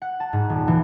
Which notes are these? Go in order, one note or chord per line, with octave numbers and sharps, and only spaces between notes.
F#5
A5
G#2
D#1
E3